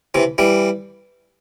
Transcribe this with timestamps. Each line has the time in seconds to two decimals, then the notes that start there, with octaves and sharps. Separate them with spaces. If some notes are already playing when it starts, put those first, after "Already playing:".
0.14 C3 E3
0.38 E3 G3